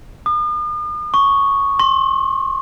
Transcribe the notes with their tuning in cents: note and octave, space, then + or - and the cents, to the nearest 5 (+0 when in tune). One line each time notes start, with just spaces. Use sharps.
D#6 -45
C#6 +0
C6 +35